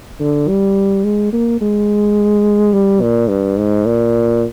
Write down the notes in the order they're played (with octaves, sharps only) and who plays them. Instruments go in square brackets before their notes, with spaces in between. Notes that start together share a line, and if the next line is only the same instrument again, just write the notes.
[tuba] D3
G3
G#3
A#3
G#3
G3
A#2
G2
G#2
A#2